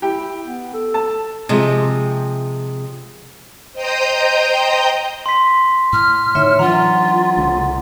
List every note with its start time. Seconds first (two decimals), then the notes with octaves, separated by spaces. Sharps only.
0.02 E4 G4 G5
0.45 B3
0.73 A4
0.94 A5
1.49 C3 F3 G#3
3.73 C5 D#5 G5 A#5 D#6 G6
5.26 C6 B6
5.93 A2 F6
6.35 A2 D3 D#4 C#5 E5
6.59 E3 F#3 D4 F4 F#5 A#5
7.37 C2 C#3 A3